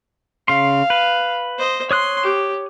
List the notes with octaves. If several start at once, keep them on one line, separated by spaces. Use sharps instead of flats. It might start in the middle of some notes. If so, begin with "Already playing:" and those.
C#3 F5 C6
B4
C5 D#5
C#5 C6 D#6 F#6
G4